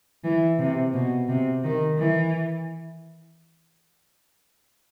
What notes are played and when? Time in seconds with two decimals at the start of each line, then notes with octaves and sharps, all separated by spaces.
0.24 E3
0.59 C3
0.94 B2
1.29 C3
1.64 D#3
1.99 E3